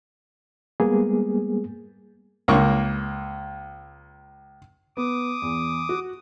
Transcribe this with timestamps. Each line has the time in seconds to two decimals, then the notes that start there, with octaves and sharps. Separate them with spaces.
0.80 G3 G#3 A#3 B3 G#4
2.48 C#2 A#3 C#6
4.97 B3 D6 D#6
5.42 E2
5.89 F#4